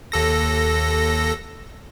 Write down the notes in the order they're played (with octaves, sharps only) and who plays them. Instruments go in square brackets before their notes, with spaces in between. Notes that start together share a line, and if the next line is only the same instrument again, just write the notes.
[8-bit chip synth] D#2 A4 A#6